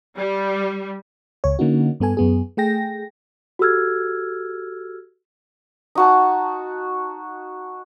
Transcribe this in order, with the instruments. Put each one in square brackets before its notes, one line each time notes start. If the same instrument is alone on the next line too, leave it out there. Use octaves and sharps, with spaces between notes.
[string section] G3
[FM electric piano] C#2 C#5
D3 A#3 C#4 D#4 F#4
G2 B3 A4 G#5
F#2 B3 G#4
A3 G#4 G5 A#6
[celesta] F#4 G4 A4 E6 F6 G#6
[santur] D#4 F#4 A5